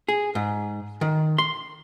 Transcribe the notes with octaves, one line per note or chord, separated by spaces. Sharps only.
G#4
G#2
D#3
C6